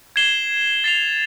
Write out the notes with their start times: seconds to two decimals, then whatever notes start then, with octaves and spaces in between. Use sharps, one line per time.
0.16 G#6 C7 E7 G7
0.84 A6 C7 F7